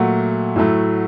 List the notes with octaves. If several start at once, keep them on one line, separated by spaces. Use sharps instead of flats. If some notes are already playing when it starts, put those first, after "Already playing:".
Already playing: A#2 F#3 A3 F#4 F#5
A2 F#3 A3